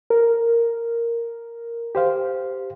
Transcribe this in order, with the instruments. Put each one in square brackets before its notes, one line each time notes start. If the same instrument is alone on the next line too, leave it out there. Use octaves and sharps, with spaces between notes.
[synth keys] A#4
[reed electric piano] G4 C5 F5